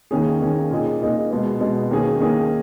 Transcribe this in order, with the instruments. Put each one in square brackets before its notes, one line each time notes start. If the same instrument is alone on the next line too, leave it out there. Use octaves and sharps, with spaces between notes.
[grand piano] D#2 D#3 A#3 C#4 G#4
D#2 D#3 A#3 C#4 G#4
A#2 A#3 D#4 G#4
A#2 A#3 D#4 G#4
B2 G#3 B3
B2 G#3 B3
D#2 D#3 A#3 C#4 G#4
D#2 D#3 A#3 C#4 G#4